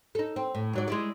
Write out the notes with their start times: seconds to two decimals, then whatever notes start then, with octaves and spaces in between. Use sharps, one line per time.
0.15 D#4 A4
0.36 C4
0.55 A2
0.73 G#2 F#3 D5
0.88 G#3 E4 D5